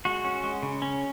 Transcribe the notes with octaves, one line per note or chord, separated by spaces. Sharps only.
G#3 F#4
C#4
G#3
C#3
C#4